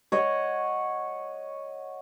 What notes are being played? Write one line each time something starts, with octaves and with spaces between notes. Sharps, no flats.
C#5 D#5 F#5